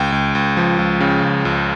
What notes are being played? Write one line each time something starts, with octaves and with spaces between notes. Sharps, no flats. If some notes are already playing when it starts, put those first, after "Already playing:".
Already playing: C#2 G5
C#2
C#2
F3
C#2
C#3
C#2
C#2